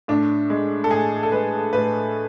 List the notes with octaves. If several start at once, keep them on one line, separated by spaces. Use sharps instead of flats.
A2 D4
G#3
A4
A2 G#4
A4
G#3 B4
A2 B4